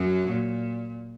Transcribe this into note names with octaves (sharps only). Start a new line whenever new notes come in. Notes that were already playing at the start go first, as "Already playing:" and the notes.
Already playing: F#2 F#3
A#2